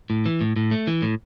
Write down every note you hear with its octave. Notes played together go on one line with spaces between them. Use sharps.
A2
E3
A2
A2
A3
E3
A2